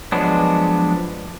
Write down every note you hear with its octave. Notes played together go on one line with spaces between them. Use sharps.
F3 F#3 G#3 B3 D4